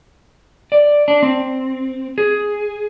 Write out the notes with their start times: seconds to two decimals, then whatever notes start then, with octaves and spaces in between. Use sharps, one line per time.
0.72 D5
1.08 D4
1.23 C4
2.18 G#4